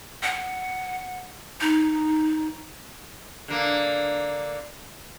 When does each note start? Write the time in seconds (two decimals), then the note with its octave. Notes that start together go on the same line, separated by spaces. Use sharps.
0.23 F#5
1.61 D#4
3.48 D3 A#3